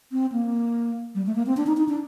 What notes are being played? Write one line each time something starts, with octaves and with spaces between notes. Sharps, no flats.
C4
A#3
G3
A3
A#3
C4
D4
D#4
D#4
D4